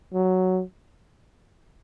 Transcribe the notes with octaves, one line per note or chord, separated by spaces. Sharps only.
F#3